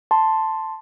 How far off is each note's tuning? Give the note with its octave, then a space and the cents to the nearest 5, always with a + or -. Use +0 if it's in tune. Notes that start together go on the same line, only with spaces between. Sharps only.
A5 +0 C6 +0